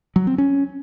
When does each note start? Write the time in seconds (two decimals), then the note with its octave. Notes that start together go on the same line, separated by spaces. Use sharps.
0.16 F#3
0.27 C4
0.38 C#4